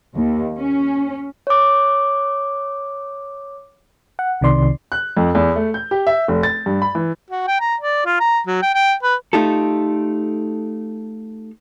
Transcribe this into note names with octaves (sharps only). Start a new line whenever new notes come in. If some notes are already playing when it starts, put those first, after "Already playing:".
D#2
C#4
C#5 D6
F#5
C2 C3 D#3 D5 C6
F#6
F2
E2
A3
G6
G4
E5
F1
A6
G2
B5
E3
F#4
G5
A#5
D5
F4
A#5
F#3
G5
G5
B4
A3 D#4 F4 G4 A4